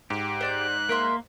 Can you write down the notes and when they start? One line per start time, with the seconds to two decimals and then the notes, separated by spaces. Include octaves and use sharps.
0.10 G#2 G4
0.41 C5 D5 F#6 G6
0.89 A#3 A#4 E5 C6